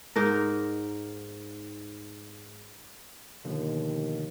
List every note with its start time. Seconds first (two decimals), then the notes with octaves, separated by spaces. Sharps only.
0.16 G#2 D#4 A#4
3.44 D#2 B2 D3 F3